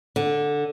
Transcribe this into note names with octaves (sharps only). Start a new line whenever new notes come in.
D3